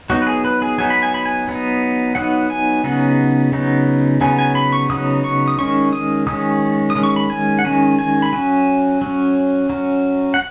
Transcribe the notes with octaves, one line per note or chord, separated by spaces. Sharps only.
F#3 B3 D#4 F#4
B4
G#4
B4
G#4
F#3 B3 D#4 G#5
B5
G#5
B5
G#5
F#3 B3 D#4
F#3 B3 D#4 F#5
G#5
C#3 F#3 B3 D#4
C#3 F#3 B3 D#4
C#3 F#3 B3 D#4 G#5
G#5
B5
C#6
C#3 F#3 B3 D#4 D#6
C#6
D#6
D#3 G#3 C#4 C#6
D#6
D#3 G#3 C#4 D#6
D#6
D#3 G#3 C#4
C#6
B5
G#5
F#5
D#3 G#3 C#4 G#5
G#5
B5
F#3 C#4 G#5
F#3 C#4
F#3 C#4
F#5